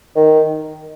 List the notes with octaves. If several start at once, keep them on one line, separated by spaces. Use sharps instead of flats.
D#3